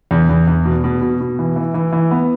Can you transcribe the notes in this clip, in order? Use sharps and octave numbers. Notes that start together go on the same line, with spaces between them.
E2
E2
E2
B2
B2
B2
B2
E3
E3
E3
E3
B3